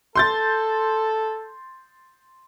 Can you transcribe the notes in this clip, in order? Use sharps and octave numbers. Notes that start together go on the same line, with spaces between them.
A4 C6 G6 A6